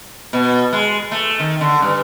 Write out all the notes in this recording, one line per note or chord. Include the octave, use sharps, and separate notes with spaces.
B2
G#3
A3
D#3
D3
G2